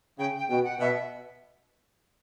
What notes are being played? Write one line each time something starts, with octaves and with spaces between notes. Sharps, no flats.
C#3 G5
G5
B2 G5
F#5
B2 E5